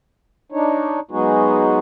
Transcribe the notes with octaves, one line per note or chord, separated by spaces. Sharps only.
D4 D#4 C#5
F#3 G#3 B3 D#4 F#4 G#4